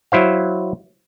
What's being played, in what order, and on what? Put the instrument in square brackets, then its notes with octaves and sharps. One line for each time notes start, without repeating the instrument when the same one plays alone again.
[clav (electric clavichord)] F#3 E4 C5 F5